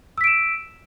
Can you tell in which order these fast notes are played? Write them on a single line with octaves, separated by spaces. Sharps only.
E6 B6 D7 E7